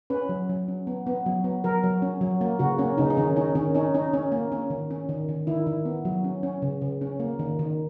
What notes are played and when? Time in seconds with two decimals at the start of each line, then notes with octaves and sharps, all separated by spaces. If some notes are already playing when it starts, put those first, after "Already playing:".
0.10 C#4 B4
0.29 F#3
0.49 F#3
0.68 C#4
0.87 B3
1.07 B3
1.26 F#3
1.44 B3
1.64 F#3 A#4
1.83 F#3
2.02 C#4
2.21 F#3
2.41 A#3
2.59 C#3 F#4
2.78 A#3 C#4
2.98 C#3 D#4
3.10 D#4
3.17 D#3 C#4
3.36 C#4 D#4
3.55 D#3 C#4
3.75 C#4 D#4
3.94 C#4 D#4
4.13 C#4
4.32 A#3
4.52 C#4
4.70 D#3
4.91 C#4
5.09 D#3
5.29 D#3
5.47 D#3 E4
5.67 D#3
5.85 B3
6.05 F#3
6.24 C#4
6.43 C#4
6.62 C#3
6.82 C#3
7.01 C#4
7.20 A#3
7.39 D#3
7.59 D#3